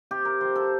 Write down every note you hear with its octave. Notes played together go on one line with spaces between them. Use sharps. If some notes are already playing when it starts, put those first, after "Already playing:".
C3 G4
A#4
F3 C4 C5
A4